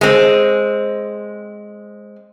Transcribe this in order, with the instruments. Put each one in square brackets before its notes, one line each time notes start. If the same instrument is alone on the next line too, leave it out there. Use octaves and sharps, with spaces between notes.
[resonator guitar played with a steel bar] G#3 C4